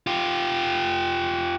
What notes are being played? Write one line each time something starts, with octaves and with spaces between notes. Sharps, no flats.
F4 G4